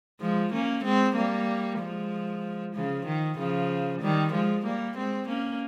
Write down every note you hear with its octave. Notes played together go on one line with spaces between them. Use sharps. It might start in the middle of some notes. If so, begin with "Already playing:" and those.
F3 G#3
A#3 C#4
G#3 C4
G3 A#3
F3 G#3
C#3 F3
D#3
C#3 F3
D#3 G3
F3 G#3
G3 A#3
G#3 C4
A#3 C#4